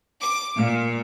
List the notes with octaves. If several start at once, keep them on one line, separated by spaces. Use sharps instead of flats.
D6
A#2